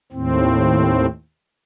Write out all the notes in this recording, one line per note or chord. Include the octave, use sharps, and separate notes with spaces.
D#2 A2 C4